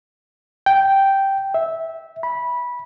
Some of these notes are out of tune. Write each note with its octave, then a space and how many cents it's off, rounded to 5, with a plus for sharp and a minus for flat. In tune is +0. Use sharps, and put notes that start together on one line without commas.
G5 -5
E5 -15
B5 -15